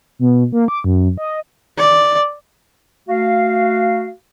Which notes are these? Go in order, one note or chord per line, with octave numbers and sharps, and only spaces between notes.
B2
A#3
D6
F#2
D#5
D5
A3 F#4 F5